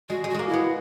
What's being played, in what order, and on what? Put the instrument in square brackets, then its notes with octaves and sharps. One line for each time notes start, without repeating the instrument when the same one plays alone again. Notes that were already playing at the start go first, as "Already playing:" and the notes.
[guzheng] G#3 [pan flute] F#4
[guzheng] G#3
[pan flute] F#4
[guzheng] G#3 A#3
[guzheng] B3 [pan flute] E4